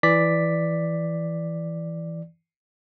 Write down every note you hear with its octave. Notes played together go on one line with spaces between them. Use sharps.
E3 D5 B6